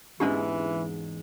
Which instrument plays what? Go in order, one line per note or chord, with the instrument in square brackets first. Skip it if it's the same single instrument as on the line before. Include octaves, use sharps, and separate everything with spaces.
[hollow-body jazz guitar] E2 G#2 G#3 [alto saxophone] E3 [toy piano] C#4 D4 G4